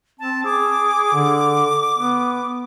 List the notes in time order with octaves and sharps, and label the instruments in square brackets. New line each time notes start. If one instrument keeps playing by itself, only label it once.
[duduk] C4 [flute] A5
[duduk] G#4 [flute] D6
[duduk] D3
B3